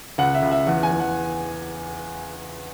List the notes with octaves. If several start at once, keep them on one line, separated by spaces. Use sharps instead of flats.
C#2 F#5
E5
C#2
E5
E2 F#5
G#5
E2
F#5